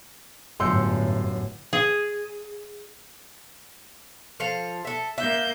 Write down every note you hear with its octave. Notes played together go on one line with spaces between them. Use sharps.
G1 F#2 A2 C6 E6 G6 C#7
G#4
F3 A4 F5
A4 E5
A#3 E5 G6